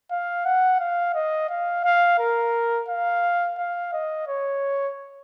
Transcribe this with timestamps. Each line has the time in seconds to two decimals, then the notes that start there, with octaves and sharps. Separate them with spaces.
0.11 F5
0.45 F#5
0.80 F5
1.15 D#5
1.50 F5
1.85 F5
2.19 A#4
2.88 F5
3.58 F5
3.93 D#5
4.28 C#5